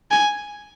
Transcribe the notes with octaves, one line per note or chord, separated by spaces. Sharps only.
G#5